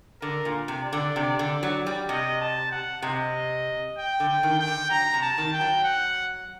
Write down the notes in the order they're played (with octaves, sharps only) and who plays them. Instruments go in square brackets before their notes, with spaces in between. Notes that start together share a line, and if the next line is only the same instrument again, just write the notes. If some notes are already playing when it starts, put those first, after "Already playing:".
[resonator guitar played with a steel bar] D3 [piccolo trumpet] A#4
[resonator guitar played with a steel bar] A#2
C3
[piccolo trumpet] D5
[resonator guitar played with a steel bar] D3
C3
D3
F#3
G3
[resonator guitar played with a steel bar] C3 [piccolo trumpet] D#5
[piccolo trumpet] A5
F#5
[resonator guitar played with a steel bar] C3 [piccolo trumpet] D#5
[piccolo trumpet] G5
[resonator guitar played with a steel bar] D3
[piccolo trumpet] G5
[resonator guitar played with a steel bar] D#3
[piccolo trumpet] G5
[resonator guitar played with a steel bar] D3
[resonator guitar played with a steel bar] F#3 [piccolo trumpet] A#5
[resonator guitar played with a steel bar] C3
[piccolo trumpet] A5
[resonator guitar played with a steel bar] D#3
[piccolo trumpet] G5
[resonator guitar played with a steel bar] F#3
[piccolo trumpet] F#5